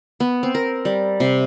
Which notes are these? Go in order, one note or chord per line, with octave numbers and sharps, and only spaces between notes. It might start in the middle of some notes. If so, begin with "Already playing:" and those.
B3
C4
A#4
G3
C3